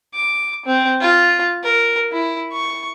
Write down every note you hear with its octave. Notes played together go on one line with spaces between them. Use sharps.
D6
C4
F4
A#4
E4
C#6